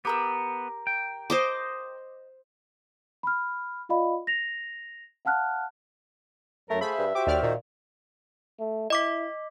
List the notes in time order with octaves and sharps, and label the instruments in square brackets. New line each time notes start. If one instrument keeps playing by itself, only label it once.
[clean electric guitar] B3 [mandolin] G4 A#4 E6
[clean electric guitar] G5
[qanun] C5 D#5 D6
[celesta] B5 F6
F4 D5 D#5 F5 B5
A#6 F7
F5 F#5 A5 F6 F#6
[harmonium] F#2 F#3 [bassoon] A3 [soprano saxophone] A#4
[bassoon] A3 [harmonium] G#4 C5 F5 [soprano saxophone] E5 [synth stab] B5
[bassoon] G2
[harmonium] F#4 C5 [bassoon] G4 [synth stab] D6
[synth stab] D#2 D5 F6
[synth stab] A#2 [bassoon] D#3
[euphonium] A3
[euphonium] E4 [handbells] D#5 D6 B6